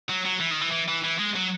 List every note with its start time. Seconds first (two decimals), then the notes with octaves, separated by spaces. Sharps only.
0.10 F#3
0.26 F#3
0.41 E3
0.51 D#3
0.62 E3
0.72 E3
0.88 E3
1.04 E3
1.19 G#3
1.35 F#3